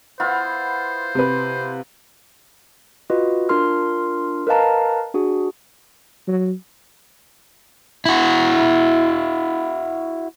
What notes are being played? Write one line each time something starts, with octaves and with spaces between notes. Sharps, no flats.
B3 E4 F4 C5
C3 B4
F4 F#4 B4 D#5
D4 F4 A#4 C6 F6
A#4 B4 D#5 F5 A5 A#5
D4 F#4 G#4
F#3
E4 F#4